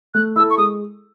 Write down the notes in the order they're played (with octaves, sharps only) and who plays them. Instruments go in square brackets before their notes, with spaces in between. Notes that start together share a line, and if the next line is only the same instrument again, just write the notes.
[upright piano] A3 [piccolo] F#6
[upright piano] E4 [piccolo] E6
[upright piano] A4
[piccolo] C#6
[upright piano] G#3 [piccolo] D#6